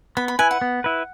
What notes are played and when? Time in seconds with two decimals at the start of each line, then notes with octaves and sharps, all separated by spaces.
0.17 B3 B5
0.28 B5
0.39 E4 B4 G#5
0.51 F#5
0.61 B3
0.84 E4 B4